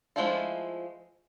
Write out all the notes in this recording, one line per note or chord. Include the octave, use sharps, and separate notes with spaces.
F3 G#3 A3 E4 F4